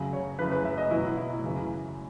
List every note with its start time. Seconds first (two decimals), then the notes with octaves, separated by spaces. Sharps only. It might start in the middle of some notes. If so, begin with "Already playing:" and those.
Already playing: F#2 C#3 F#3
0.13 C#5
0.39 F#2 C#3 E3 B4
0.51 B4
0.65 E5
0.78 D#5
0.91 E2 B2 F#3 E4
1.17 E4
1.42 F#2 C#3 E3